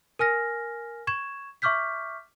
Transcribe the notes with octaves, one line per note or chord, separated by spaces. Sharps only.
A#4 G#5 F6 A#6
C#6 G#6 E7
E5 C#6 D6 F6 G6 B6